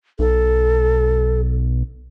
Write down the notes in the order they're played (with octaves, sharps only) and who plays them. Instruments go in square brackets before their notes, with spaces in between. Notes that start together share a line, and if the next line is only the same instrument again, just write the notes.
[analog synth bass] B1 [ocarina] A4